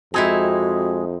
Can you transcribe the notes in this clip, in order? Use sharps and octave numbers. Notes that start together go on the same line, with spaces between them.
F2 G#3 C4 D#4 E4 F#4 G#4